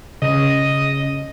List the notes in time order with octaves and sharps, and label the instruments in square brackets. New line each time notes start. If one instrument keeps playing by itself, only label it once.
[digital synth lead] C#3 [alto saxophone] D#5